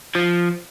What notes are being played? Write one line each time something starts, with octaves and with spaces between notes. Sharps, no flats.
F3